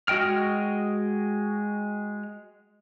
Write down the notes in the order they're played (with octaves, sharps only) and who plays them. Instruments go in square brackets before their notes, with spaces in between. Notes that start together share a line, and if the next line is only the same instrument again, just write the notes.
[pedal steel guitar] G#3 F#4 D#5 G5 F6